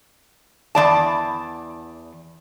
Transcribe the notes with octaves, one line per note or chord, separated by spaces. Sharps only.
E2 G#3 D5 A5